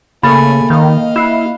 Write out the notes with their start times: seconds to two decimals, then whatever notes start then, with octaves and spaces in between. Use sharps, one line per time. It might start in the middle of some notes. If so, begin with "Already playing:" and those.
0.23 C#3 A3 A#3 G#5 B5 A6
0.70 D#3 D#5 F5
1.16 E4 F#6 C7 E7